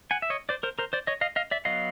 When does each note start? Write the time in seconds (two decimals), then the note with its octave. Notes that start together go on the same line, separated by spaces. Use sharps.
0.11 F#5 G#5
0.22 E5
0.30 C#5 D#5
0.49 C5 D5
0.63 A#4 C5
0.79 A#4 C5
0.93 C5 D5
1.07 C#5 D#5
1.21 D#5 F5
1.36 D#5 F5
1.51 D5 E5
1.65 F#3 B3 D#5 F5